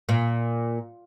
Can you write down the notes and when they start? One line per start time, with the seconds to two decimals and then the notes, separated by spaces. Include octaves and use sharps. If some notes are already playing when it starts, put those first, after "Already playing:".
0.09 A#2